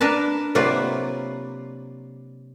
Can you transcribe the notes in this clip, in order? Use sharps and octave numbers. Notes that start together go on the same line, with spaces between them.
D4 A#4 B4 A5
C3 F#3 A#3 F4 B4 D5